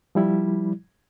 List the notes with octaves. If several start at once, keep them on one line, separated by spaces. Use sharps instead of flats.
F3 G3 E4